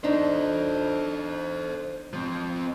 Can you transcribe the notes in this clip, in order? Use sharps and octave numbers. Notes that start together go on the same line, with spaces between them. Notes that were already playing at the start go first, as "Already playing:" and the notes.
D4 D#4 A4 C5
F3 C4